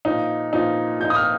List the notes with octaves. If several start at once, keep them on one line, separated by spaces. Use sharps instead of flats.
A#2 F3 D#4
A#2 F3 D#4
A#2 F3 D#4 G6
D#6
F6